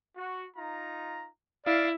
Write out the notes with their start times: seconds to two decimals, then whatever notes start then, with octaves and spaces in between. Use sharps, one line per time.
0.17 F#4
0.57 D#4 F4 A#5
1.66 E4 D5 F5